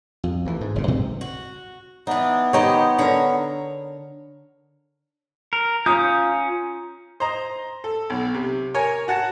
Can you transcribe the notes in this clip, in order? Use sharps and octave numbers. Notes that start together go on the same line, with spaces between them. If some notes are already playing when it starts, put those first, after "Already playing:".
F2
D2 E3
G#2
F#1 C#3
G2 C3 C4
F#4
E3 B3 D4 D#4
D#3 D#4 G4 C5 C#5
D3 A#4 C#5 A#5
A#4
C#4 F4 F5 A#5 D#6 G6
C5 D#5 A#5
A4
B1
C3
A#4 C#5 G#5
F#4 F#5 A5